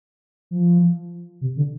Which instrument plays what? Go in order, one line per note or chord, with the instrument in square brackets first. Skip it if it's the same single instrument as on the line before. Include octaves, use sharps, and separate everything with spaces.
[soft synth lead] F3
C3
D3